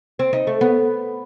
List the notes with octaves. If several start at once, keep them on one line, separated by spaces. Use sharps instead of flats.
C4
D#4
A3
B3